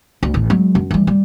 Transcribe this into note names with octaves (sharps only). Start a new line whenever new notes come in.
D2
A1
F#3 G#3
F#2
E3 G3
G3